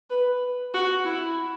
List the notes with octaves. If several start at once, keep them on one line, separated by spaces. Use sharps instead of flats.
B4
F#4
E4